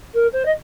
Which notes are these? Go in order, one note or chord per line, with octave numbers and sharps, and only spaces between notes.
A#4
C5
D#5